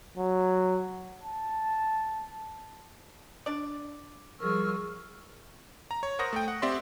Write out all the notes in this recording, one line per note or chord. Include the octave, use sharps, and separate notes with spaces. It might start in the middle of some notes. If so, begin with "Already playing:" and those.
F#3
A5
D4 D5
F3 G3 G#4 A#4 C#6 E6 F6
A#5
C#5
A#4 C5 F#5 C#6 D#6 A#6
A3 G5
F#5
C4 G4 D5 E5 F#5 C6